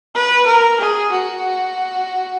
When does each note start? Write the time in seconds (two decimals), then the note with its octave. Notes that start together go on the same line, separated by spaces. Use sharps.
0.15 B4
0.47 A#4
0.80 G#4
1.11 F#4